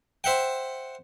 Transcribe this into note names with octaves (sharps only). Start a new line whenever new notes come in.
C5 E5 F#5 G5